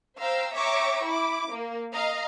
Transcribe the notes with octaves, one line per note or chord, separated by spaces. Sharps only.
C5 F5 G5 A#5 E6
C#5 E5 G5 A#5 C#6 D6
E4 D6
A#3
D#5 F5 A#5